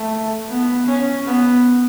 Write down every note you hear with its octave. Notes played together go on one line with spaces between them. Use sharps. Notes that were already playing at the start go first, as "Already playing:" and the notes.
Already playing: A3
B3
C#4
B3